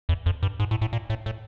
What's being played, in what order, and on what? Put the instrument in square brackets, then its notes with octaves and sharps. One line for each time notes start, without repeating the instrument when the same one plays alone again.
[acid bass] E2
F2
G2
G#2
A2
A2
A#2
A2
A2